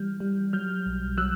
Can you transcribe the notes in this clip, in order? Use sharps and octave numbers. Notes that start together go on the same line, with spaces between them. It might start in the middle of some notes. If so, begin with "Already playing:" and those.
Already playing: E3 G3 F6 G6
G3
F#3 F6 G6
B1
F#3 E6 F#6